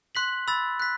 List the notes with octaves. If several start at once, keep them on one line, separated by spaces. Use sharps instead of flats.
C6 F#6 B6 F#7
B5 E6 A6
F#6 B6